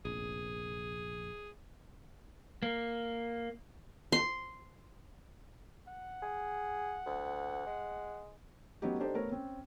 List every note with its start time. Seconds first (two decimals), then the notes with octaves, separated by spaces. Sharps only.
0.05 F1 A#1 G#4
2.63 A#3
4.12 C6
5.88 F#5
6.23 G#4
7.06 D2
7.66 G#3
8.82 F#3 A3 B3 C#4 D#4 G4
8.99 D4 D#4 G4 A4 C5 D5
9.14 A3 B3 A#4 B4 C#5
9.31 C4 C#4